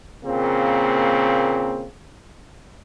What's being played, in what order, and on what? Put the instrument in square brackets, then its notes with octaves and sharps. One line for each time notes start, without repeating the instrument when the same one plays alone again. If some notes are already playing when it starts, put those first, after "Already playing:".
[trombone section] A#2 C#3 A#3 C4